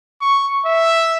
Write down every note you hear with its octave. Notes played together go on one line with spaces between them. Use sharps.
C#6
E5